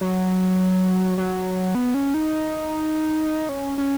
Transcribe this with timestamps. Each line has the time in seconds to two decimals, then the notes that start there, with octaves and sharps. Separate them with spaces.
0.01 F#3
1.18 F#3
1.75 B3
1.94 C#4
2.14 D#4
3.49 C#4
3.78 C#4